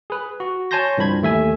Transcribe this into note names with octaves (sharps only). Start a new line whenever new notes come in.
G#4 B4
F#4
C#5 G#5 A5 C6 G6 A#6
C2 G2 F3 B5 G#6
D#2 A3 E5 G#5